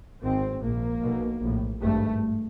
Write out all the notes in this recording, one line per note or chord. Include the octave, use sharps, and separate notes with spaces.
G#1 G#2 C4
A#1 A#2 A#3
B1 B2
A#1 A2
G#1 G2 A3